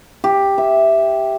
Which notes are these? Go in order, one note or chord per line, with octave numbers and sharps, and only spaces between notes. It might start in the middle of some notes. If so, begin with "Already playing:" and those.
G4
E5